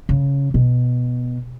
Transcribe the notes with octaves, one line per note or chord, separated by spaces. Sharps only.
C#3
B2